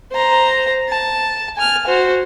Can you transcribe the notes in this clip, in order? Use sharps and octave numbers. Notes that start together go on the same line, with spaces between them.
C5 A#5
A5
G#5 F6
F#4 C5